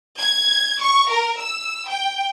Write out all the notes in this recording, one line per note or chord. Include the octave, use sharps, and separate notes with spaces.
G#6
C#6
A#4
E6
G5